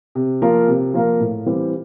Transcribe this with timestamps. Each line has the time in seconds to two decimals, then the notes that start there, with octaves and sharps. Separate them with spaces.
0.15 C3
0.42 F3 A#3 F4 A#4
0.68 C3
0.94 F3 A#3 F4 A#4
1.20 A2
1.46 E3 G3 C4 G4